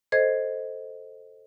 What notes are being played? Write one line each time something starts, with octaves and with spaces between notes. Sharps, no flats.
A4 C5 D#5 G#6